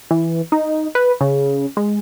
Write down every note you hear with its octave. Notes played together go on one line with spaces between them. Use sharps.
E3
D#4
B4
C#3
G#3